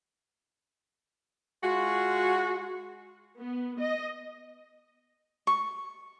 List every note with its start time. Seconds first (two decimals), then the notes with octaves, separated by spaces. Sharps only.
1.64 G#3 F4 F#4
3.40 B3
3.81 D#5
5.47 C#6